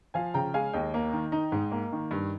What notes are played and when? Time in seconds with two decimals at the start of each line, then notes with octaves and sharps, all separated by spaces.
0.14 F3 F5 G#5
0.34 C#3 G5 A#5
0.54 G#3 F5 G#5
0.73 D#2 D#5 G5
0.94 A#3
1.13 D#3
1.32 D#4
1.52 G#2
1.72 A#3
1.92 D#3
2.11 G2